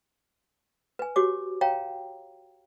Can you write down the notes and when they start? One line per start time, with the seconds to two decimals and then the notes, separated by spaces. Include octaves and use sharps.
0.99 B4 G#5
1.16 F#4 G4 C#5 D6
1.61 C#5 F5 G5 A#5